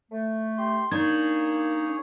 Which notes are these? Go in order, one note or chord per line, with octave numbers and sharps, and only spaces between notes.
A3
G4 C6
A#3 D4 D#4 G#4 C#5 G#6